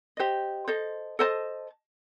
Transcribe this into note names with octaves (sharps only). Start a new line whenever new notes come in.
G4 C5 D#5
A4 C5 D#5
A4 C5 D#5 A5